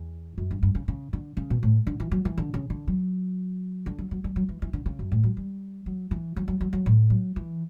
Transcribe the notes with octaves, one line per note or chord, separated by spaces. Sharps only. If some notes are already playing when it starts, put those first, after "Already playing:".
Already playing: E2
F#2
G2
G2
C#3
C#3
D3
C#3
B2
A2
D3
E3
F#3
E3
D3
C#3
D3
F#3
D3
F#3
F#3
G3
F#3
E3
E3
D3
C#3
F#2
A2
F#3
G3
F#3
E3
F#3
F#3
F#3
F#3
A2
F#3
E3